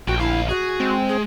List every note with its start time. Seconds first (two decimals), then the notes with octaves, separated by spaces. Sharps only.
0.08 A#1 A2 F#4 G5
0.20 D2 E4 F5
0.49 F#4 G#4
0.80 G#3 C4
1.09 G#4